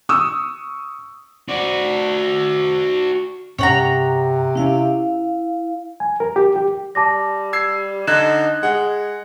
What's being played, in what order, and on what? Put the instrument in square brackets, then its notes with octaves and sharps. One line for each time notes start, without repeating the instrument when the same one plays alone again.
[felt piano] C#6 D#6 E6
[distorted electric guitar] F#4 D5
[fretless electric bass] G2 C#4 [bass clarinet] C3 [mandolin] C#5 F#5 A#5 [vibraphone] G5
[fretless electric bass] C4 C#4 [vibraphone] E4 F5
[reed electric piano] G#5
A#4
G4
G4
[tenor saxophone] G3 [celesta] A5 D6 A#6
[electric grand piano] E6 G#6 C7
[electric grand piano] D3 F#6 G#6 [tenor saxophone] D#4 [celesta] E7
[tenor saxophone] G#3 [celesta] G#4 [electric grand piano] F#5